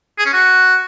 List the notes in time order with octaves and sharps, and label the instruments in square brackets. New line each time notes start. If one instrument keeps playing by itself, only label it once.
[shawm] G#4
C#4
F#4